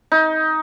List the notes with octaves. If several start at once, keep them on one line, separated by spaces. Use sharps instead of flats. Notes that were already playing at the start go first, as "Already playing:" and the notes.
D#4